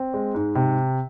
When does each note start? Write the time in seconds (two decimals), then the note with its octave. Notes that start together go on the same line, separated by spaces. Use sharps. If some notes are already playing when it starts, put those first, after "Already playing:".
Already playing: C4
0.14 G#3
0.34 G#2
0.55 C3